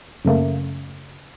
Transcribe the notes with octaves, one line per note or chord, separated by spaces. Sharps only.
F#2 C#3 A3 A#3